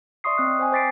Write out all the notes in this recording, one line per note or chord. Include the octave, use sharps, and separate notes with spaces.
D5 E5 C6 C#6 D#6 C7
C4 D#5 D#6 F#6
C5 G5 G#5
C5 D6 A6 B6 C7 D7